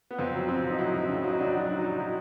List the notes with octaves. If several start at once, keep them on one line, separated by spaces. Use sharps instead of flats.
B3
F2 C4
F#3
F2 C4
F2
D#4
F#3 E4
F2
C#3
F#3 D#4
F#3 D4
F#3
D4
F#3
D#4
F#3
E4